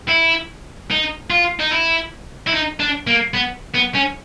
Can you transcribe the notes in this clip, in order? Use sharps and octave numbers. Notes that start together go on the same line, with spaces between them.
E4
D#4
F4
D#4
E4
E4
D#4
D4
A#3
B3
B3
C#4